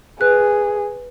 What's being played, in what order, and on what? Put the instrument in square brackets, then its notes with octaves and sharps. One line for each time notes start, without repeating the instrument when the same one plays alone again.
[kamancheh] G#4 [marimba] B4 F#6